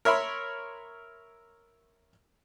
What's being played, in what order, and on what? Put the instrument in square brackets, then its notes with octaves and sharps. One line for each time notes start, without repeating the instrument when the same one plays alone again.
[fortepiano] A#4 C#5 E5 B5 C6